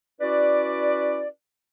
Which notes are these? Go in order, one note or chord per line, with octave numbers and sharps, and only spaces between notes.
C#4 E4 F#4 B4 D5